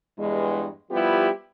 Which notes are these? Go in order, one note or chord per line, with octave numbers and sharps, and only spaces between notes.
E2 G2 G#3
F3 G3 B3 E4 F4 G4